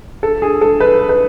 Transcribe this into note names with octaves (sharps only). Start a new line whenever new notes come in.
A4
G#4
A4
B4
B4